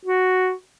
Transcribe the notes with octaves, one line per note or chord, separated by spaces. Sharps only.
F#4